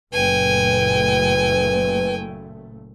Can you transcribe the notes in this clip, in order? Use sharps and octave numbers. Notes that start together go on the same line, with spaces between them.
F#1 A#2 A3 B4 G5 G#5